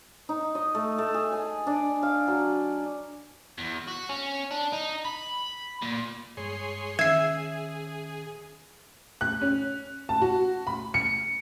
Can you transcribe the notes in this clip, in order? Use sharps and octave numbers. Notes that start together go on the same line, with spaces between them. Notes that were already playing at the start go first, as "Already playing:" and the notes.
D#4
D#5
A3
A3
G#4
G#5
D4
F5
F#3
E2
F#4
C#4
D4
D#4
B5
A#2
G2 G#3 G#4 C#5 C6
D#3 C#4 G#4 E5 G#6 C7
F#6
C#4
A5
F#4
B5
C#7